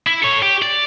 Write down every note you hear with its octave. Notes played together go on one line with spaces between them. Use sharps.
E4
A4 C#5
G4
D5